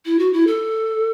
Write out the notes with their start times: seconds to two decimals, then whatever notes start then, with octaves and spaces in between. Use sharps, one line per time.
0.06 E4
0.19 F#4
0.33 E4
0.47 A4